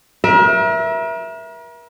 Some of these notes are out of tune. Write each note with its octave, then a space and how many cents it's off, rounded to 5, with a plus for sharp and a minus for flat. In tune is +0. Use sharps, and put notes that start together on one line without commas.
A#4 +40 E5 +0